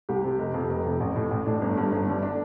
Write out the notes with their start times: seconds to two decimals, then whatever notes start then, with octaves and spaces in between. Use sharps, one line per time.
0.09 C2 G4
0.24 C3
0.39 F1
0.54 F2 C3
0.70 F1
0.85 F2 C3
1.00 A1
1.16 A2
1.31 A1
1.46 A2 D4
1.62 G1
1.77 G2 D3
1.92 G1
2.07 G2 D3
2.22 D4